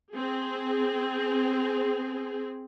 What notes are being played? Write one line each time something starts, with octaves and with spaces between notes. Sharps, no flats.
C4 G#4